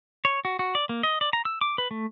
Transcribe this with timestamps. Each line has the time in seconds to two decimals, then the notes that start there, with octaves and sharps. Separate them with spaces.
0.25 C#5
0.45 F#4
0.59 F#4
0.75 D5
0.89 A#3
1.03 D#5
1.21 D5
1.33 A#5
1.45 E6
1.61 D6
1.78 B4
1.91 A3